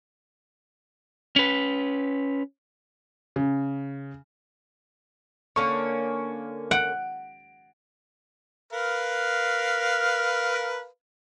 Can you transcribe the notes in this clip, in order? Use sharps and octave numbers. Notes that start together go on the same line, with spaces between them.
C#4 B4
C#3
D3 A#3 C#4 C#6
F#5 D7
A#4 B4 F5